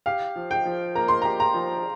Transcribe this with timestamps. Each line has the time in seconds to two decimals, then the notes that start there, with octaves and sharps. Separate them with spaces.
0.06 G4 F5
0.36 F3
0.51 G5
0.65 F3
0.96 A#3 A#5
1.08 C6
1.22 G4 A#5
1.40 A#5
1.54 F3